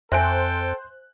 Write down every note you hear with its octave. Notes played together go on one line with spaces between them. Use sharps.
F2 A4 C5 E5 G5 G#5 F#6